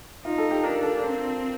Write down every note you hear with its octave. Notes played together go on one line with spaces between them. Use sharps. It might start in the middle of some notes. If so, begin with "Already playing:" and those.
D#4 F4
A4
G4
D4 A#4
A4
C4